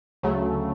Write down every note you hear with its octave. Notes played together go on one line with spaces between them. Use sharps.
D2 C#3 F#3 A3